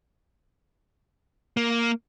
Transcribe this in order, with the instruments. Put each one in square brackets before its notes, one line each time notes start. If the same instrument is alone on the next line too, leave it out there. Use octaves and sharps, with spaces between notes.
[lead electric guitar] A#3